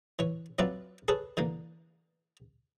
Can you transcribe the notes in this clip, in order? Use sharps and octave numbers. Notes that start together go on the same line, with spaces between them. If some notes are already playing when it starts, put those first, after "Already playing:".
E3 C#5
F#3 C4 F4 B4 D5 E5
G#4 A4 B4 C#5
D3 E3 A#3